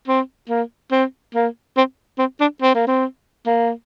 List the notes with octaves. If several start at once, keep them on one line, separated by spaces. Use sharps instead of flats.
C4
A#3
C4
A#3
C4
C4
D4
C4
A#3
C4
A#3